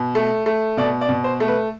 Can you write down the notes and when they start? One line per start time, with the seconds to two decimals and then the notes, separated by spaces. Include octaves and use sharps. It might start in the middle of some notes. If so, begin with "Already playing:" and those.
Already playing: B2
0.15 A3
0.46 A3
0.77 B2 D5
1.01 D5
1.09 B2
1.24 C5
1.40 A3
1.48 B4